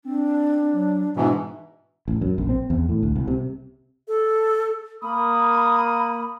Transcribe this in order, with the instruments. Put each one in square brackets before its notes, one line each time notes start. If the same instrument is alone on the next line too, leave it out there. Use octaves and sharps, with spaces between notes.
[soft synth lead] C4 [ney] D4
[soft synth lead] F#3
[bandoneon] G#2 B2 E3 [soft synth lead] D4 [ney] E5
[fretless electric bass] A1
F#2
A#1
C4
E2
A2
D2
C2
C3
[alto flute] A4
[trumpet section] A#3 D#6 [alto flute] B5